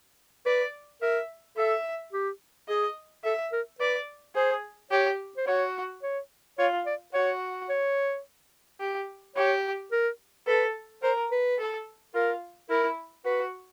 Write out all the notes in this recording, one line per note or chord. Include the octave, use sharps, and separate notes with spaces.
B4 D5
A#4 E5
A4 E5
G4
G#4 D#5
A4 E5
A#4
B4 D5
G#4 C5
G4 C#5
C5
F#4 C#5
C#5
F4 C#5
D5
F#4 C#5
C#5
G4
G4 C#5
A#4
A4 B4
A#4 C5
B4
A4
F4 A#4
E4 A#4
F#4 B4